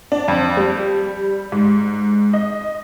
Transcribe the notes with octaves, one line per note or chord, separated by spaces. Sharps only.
D4
F2
G3
G#2
D#5